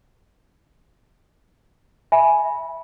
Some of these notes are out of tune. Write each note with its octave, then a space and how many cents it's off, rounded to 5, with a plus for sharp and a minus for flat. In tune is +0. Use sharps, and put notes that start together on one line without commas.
E5 +0 G#5 +0 B5 -15